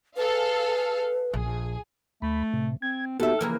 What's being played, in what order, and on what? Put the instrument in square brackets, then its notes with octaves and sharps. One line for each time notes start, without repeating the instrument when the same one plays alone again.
[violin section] G#4 A4 F5 [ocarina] B4
[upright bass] A#1 [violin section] G#4
[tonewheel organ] D2 B5 [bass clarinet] A3
[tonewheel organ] A2 C3
[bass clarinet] C4 [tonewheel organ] G#6
[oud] D#2 E5 [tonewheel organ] B3 F#4 G4 [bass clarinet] A4
[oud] C#3 E3 A#3 [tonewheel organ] F3